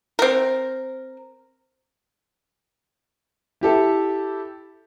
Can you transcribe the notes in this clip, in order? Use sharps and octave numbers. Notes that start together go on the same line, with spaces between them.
C4 A#4
E4 G4 A4 E5